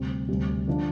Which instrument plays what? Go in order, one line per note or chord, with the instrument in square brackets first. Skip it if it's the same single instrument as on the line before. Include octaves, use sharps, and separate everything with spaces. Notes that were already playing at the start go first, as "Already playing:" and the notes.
Already playing: [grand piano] D2 C3 G3 C4
D2 C3 G3
D3 F3 D4